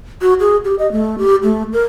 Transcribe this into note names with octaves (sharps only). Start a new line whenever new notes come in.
F#4
G#4
G4
D#5
A3
G4
A3
A#4